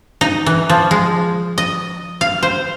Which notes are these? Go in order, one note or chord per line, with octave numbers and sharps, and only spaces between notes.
D#4
E3
F3
G#3
D#5
F5
C5